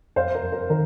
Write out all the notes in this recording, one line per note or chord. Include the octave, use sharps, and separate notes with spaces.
F2 C5 F5
A#4
F2
A#4
D#3 A#4